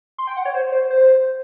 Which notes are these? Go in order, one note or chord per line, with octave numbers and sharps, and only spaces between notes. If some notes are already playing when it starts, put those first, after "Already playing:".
C6
G5
F#5
C#5
C5
C5
C5